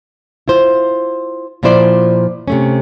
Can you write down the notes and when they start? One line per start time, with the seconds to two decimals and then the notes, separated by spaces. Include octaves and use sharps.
0.48 E4 F4 C5
1.63 A#2 F3 E4 C5 D5
2.48 C3 A3 C#4